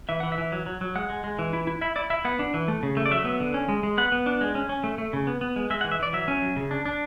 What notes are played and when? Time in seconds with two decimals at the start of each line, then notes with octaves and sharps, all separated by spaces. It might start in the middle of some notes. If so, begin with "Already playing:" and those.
0.09 E3 E5
0.20 E3 F#5
0.32 E5
0.38 E3
0.52 F#3
0.66 F#3
0.81 F#3
0.95 G#3 F#5
1.10 G#3
1.24 G#3
1.39 E3
1.53 E4
1.67 E4
1.81 E4 E5
1.96 E4 D5
2.10 E4 E5
2.25 B3 F#5
2.39 D4
2.54 E3
2.68 A3
2.83 C#3
2.97 A3
3.06 D5
3.11 F#3 E5
3.25 B3
3.40 D3
3.54 C#4
3.69 G#3
3.83 G#3
3.98 B3 F#5
4.12 B3
4.26 D4
4.41 G#3
4.55 C#4
4.69 C#4
4.84 A3
4.98 A3
5.13 C#3
5.27 B3
5.41 B3
5.56 G#3
5.70 G#3 E5
5.81 F#5
5.84 E3
5.92 E5
5.99 E3 D5
6.13 F#3 E5
6.28 C#4
6.42 F#3
6.56 C#3
6.71 D4
6.86 D4